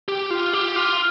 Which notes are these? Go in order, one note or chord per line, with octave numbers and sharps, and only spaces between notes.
G4
F4
G4
F4